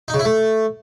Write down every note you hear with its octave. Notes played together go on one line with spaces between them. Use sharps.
D#4
C#3
E4
A3